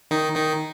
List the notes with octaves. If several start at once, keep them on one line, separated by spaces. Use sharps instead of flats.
D#3 D#4
D#3 D#4